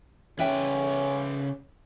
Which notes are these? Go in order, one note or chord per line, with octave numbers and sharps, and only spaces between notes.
C#3 C#4 B4 D5 E5 G5